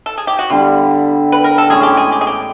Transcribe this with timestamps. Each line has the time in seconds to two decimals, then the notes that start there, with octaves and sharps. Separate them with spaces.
0.06 A4
0.18 G#4
0.27 G4
0.39 F#4
0.50 D3 G3 B3 E4 F4
1.32 B4
1.44 A#4
1.58 A4
1.68 A2 E3 G#3 C#4 G#4
1.83 G4
1.97 G#4
2.12 G4
2.21 G#4
2.27 G4